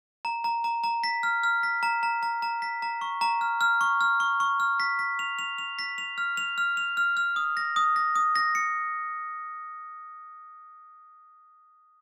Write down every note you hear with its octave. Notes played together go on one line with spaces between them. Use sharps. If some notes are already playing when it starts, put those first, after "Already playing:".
A#5
A#5
A#5
A#5
B6
F6
F6
B6
A#5
A#5
A#5
A#5
B6
A#5
C#6
A#5
F6
F6
C#6
F6
C#6
C#6
F6
B6
B6
F7
F7
F7
B6
F7
F6
F7
F6
F7
F6
F6
D#6
A#6
D#6
A#6
D#6
A#6
C#7